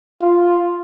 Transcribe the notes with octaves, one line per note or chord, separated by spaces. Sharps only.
F4